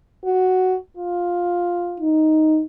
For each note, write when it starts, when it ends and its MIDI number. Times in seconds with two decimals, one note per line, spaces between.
0.25 0.77 66
0.97 2.08 65
2.00 2.63 63